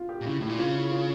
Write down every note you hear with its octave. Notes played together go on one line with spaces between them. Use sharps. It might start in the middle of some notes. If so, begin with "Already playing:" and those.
Already playing: F4
G4
A#2
C#3 E4
A2 E4
A#2
C#3 F4
E4
F4